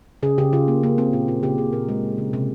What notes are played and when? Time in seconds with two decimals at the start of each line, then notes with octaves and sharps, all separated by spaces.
0.23 C#3 G#4
0.38 C#3 G4
0.53 C#3 F4
0.68 A#3
0.83 C#3 A#3
0.98 C#3 C4
1.13 A#2 F4
1.28 A#2 F4
1.43 C#3 G4
1.58 C#3 G#4
1.73 A#2 A#4
1.88 G#3
2.03 C#3
2.18 C#3
2.33 C3